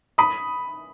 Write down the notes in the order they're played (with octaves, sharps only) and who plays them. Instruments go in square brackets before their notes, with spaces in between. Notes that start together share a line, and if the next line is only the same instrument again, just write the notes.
[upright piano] B5 D#6